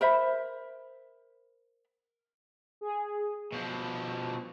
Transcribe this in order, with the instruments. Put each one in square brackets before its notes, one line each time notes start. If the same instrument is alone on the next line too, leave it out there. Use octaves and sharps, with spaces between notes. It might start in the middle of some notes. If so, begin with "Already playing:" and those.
[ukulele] A#4 C5 E5 B5
[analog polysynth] G#4
[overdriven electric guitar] B2 F3